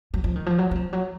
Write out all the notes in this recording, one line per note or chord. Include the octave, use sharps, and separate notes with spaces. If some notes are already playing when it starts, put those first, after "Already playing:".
F#3
F3
D#3
F3
F#3
F#3
F3
F#3